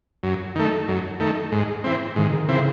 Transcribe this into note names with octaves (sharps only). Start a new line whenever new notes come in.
F#2
D#3 A3
F#2
D#3 A3
G#2
E3 C4
G#2 D#3
D#3
C#3 E3 C4